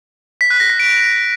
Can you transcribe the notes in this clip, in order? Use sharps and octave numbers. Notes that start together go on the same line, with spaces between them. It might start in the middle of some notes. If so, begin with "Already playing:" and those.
B6
F#6
A#6
B6
D7